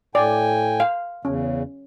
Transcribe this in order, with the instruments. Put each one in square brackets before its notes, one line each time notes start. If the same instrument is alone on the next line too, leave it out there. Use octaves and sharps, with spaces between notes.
[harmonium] A2 G5 G#5 [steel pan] D5
[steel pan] F5
[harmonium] E2 C#3 [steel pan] C#4